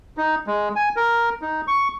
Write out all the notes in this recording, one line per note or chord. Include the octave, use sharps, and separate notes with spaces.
D#4
G#3
G#5
A#4
D#4
C#6